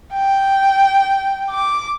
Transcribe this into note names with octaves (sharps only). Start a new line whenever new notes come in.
G5
D6